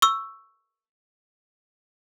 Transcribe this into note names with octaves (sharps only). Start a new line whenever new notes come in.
C#6 E6